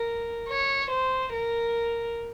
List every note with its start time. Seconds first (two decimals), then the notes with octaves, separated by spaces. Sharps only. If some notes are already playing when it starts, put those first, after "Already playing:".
Already playing: A#4
0.49 C#5
0.91 C5
1.33 A#4